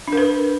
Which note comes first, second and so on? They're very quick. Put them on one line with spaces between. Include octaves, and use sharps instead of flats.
D4 A#4 B4